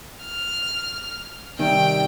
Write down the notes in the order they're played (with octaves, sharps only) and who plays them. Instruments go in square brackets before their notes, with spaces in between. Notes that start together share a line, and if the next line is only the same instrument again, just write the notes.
[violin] F6
[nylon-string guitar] C3 D#3 G3 [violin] G5